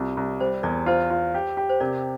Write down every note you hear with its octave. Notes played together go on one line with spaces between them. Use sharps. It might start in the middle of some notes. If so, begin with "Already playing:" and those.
Already playing: C2 F4
C2
G3 C5
E2 A#4 D5
F4 C5
F4
G4
G4
C5
C3 A#4 D5